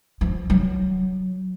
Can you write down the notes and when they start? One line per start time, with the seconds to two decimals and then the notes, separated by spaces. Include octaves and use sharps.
0.21 F3
0.50 F#3